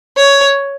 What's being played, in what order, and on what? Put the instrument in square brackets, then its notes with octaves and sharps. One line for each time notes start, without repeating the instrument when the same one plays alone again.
[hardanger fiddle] C#5